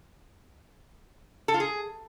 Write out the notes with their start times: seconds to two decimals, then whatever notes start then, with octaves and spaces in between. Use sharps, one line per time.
1.48 A4
1.54 F4
1.60 G#4